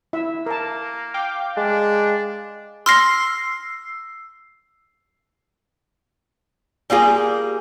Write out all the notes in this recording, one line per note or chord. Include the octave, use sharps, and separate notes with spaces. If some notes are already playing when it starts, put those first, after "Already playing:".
E4 E5
A#3 A#4 A5
F5 G5 D6
G#3 D4
C6 E6 F6 A#6 C7
G3 A#3 F4 G#4